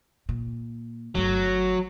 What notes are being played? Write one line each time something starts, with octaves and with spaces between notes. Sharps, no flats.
A#2
G1 F#3 A3